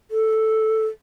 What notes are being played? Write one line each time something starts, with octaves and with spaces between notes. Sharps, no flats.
A4